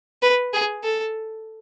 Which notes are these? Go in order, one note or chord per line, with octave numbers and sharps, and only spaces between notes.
B4
G#4
A4